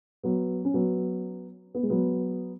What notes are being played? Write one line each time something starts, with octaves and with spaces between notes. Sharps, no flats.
F#3 B3
C#4
F#3 B3
B3
G#3
F#3 B3